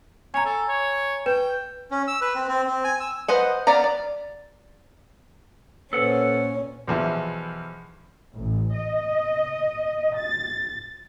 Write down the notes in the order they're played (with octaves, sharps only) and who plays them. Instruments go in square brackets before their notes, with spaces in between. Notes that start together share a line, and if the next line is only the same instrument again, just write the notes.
[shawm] C#5 [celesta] G#5 A#5
[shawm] A4
C#5
[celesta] B4 [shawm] G5
[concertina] C#4
E6
B4
C4
C4
C4
G#5
E6
[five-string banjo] B4 C5 D#5 F#5
B3 D5 F5 A#5
D5
[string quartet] A#2 C#4 [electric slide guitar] A4 F#5 [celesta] B4 C5
[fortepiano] B1 E2 F3 E4
[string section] A1
D#5
A6